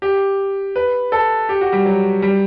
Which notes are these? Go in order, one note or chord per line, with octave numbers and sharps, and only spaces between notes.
G4
B4
A4
G4
F#4
G3
F#3
G3